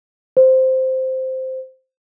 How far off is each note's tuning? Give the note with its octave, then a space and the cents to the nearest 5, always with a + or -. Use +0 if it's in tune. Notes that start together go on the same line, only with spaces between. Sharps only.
C5 -5